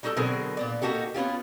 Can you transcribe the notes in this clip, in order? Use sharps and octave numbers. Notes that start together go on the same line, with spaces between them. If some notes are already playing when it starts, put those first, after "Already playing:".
G3 D#4 F#4 G4 A4
B2 D3 F#3 C4 G#4 A#4
A#2 B3 D5
A#3 D#4 F#4 G4 A4
B3 C#4 F4 G4